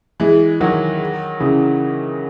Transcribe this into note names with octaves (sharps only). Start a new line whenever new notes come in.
E3 G#3
D#3 F#3
C#3 E3